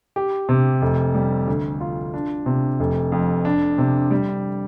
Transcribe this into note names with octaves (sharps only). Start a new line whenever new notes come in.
G4
C3
F1
G3
D2
F4
D4
C3
F1
F2
D4
C3
G3